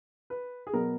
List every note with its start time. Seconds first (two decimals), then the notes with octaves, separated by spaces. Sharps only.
0.30 B4
0.67 G#4
0.73 B2 F#3 B3 A#4